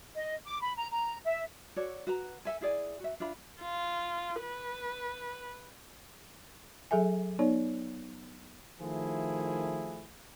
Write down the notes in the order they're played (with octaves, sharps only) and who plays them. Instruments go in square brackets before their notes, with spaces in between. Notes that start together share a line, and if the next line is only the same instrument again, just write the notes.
[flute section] D#5
D6
B5
A#5
A#5
E5
[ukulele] F#4 A4 C#5 D5
F#4 B4 A#5
A4 E5 G#5
E4 G#4 D5 G#5
F#4 E5
D4 F4 E5 B5
[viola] F4
B4
[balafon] F#3 G#4 A4 E5 G#5
B3 D#4 C#5 D5
[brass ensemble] D#3 F3 A3 E4 G#4